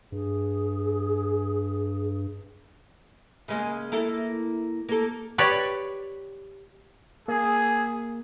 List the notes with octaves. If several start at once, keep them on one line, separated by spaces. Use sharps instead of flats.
G2 G#4
C#3 G#3 A#3
A#3 E4 A4
A#3 A4
G4 B4 C#5 D5
A#3 G#4